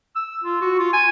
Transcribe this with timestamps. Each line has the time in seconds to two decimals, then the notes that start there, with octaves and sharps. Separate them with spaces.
0.16 E6
0.44 F4
0.62 F#4
0.79 F4
0.93 G#5